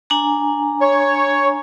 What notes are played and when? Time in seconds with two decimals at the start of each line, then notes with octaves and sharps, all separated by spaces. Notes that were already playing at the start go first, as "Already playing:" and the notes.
0.10 D4 G#5 A#5
0.81 C#5